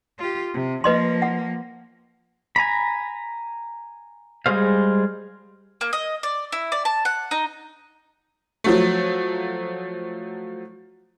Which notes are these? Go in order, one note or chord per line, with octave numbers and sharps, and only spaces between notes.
F4 G4
C3
F3 A#3 B4 D#5 C6
F#5
G#5 A#5 B5
G3 G#3 G#4 C5 F5
A#3
D#5
D5
E4
D5
A5
F#5
D#4
F3 F#3 A3